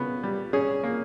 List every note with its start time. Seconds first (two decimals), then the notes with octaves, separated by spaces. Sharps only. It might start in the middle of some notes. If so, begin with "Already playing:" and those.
Already playing: C#3 B3
0.23 G3
0.53 C#4 G#4
0.83 A#3